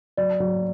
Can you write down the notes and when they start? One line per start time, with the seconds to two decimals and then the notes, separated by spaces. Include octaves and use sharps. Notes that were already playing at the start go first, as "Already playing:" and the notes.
0.17 F#3 D5
0.40 F#3